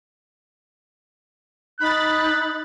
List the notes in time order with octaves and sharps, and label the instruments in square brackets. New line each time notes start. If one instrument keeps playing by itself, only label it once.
[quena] D#4 [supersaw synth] B5 A6 [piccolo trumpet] F#6